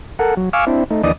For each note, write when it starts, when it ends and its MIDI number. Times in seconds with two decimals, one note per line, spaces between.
0.19 0.35 69
0.19 0.35 70
0.19 0.35 78
0.37 0.49 54
0.53 0.65 77
0.53 0.65 80
0.53 0.65 85
0.53 0.65 86
0.53 0.65 88
0.53 0.65 89
0.67 0.84 60
0.67 0.84 62
0.67 0.84 64
0.91 1.02 57
0.91 1.02 63
1.04 1.12 39
1.04 1.12 52
1.04 1.12 62
1.04 1.12 74
1.04 1.12 75
1.04 1.12 87